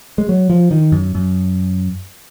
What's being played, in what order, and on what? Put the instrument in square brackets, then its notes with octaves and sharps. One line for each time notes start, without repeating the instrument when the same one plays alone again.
[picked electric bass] G#3
F#3
F3
D#3
F#2
F#2